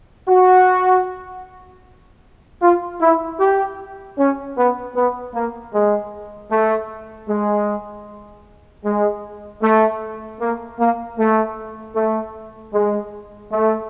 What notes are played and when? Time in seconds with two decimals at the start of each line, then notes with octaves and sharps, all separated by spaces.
0.28 F#4
2.62 F4
3.01 E4
3.40 G4
4.18 C#4
4.57 B3
4.95 B3
5.34 A#3
5.73 G#3
6.52 A3
7.28 G#3
8.85 G#3
9.62 A3
10.40 A#3
10.79 A#3
11.18 A3
11.96 A3
12.73 G#3
13.52 A3